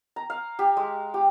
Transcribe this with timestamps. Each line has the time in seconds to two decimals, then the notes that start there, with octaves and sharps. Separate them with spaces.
0.16 A#5
0.30 F5
0.59 G4
0.77 G#3
1.14 G4